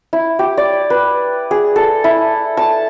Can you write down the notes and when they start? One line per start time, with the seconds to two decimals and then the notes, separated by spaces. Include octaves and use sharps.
0.13 E4
0.39 G4
0.58 D5
0.90 B4
1.51 G#4
1.76 A4
2.04 E4
2.57 A5